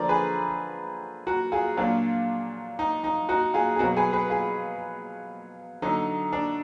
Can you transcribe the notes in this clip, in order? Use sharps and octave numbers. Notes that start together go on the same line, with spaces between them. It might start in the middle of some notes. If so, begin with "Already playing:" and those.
Already playing: D3 F3 A#4 D5
G#4 B4
F#4 A#4
F4 G#4
A#2 F#3 D4 F4
D#4
D#4
D#4 F#4
F4 G#4
G#4
B2 F#3 F#4 A#4
G#4 B4
G#4 B4
F4 G#4
D3 F#3 D#4
D4